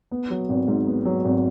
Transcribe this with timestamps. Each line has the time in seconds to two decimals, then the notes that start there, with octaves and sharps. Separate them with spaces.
0.11 B3
0.30 F#3
0.49 G#1
0.68 G#2
0.87 B3
1.05 F#3
1.25 G#1